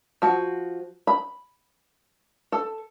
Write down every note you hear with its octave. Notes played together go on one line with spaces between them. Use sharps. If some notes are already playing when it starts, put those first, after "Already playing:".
F3 F#4
B5
A4